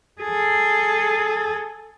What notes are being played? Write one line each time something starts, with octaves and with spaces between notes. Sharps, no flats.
G#4 A4